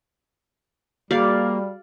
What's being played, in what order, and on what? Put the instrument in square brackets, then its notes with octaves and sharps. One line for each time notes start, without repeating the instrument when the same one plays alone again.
[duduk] G3 [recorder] A#3 [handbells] F#4 G#4 [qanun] D5 F5